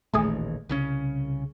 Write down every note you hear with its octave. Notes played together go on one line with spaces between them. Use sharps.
D#1 A1 D#2 A3 G#4
C2 C#3 C#4